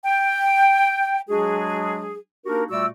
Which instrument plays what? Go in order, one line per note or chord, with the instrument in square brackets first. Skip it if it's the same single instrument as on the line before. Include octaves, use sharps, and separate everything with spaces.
[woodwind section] G5
F#3 G#3 D4 F#4 G#4
A#3 D4 D#4 F#4 G4 A#4
A#2 G3 A3 F#4 D5 E6